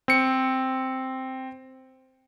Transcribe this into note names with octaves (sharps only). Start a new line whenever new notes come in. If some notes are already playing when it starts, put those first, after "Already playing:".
C4 C#7